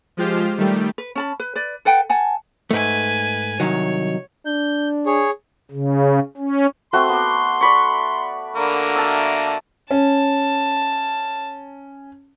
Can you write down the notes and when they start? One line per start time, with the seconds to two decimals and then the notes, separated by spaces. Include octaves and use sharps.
0.17 F3 G#3 F4 G4 C5 F5
0.58 D#3 G3 A3 G4
0.98 B4
1.15 C#4 A5 B5
1.40 B4
1.56 B4 D5
1.85 A4 B4 F#5 G5
2.09 F#5 G#5 A5
2.71 G#2 A3 B4 G#5
3.60 C2 D#3 F#3 C#5
4.46 D4 G6
5.06 G#4 C#5
5.71 C#3
6.37 C#4
6.93 A3 C4 F#4 C6
7.09 B3 D6
7.61 D5 B5 C#6
8.56 D3 A#3 A#4
8.96 E5 A5
9.91 C#4 A5